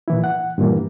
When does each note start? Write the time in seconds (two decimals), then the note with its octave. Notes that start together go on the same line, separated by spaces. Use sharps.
0.08 A#2 E3 E4
0.24 F#5
0.58 G2 A#2 E3 A#3